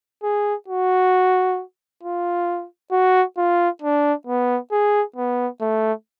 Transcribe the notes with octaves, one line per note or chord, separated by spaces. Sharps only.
G#4
F#4
F4
F#4
F4
D4
B3
G#4
B3
A3